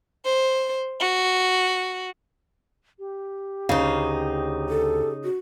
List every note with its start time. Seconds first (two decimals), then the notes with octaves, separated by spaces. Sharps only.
0.25 C5
1.00 F#4
2.99 G4
3.69 D2 C#3 D#4 F5
4.69 A4
5.24 F#4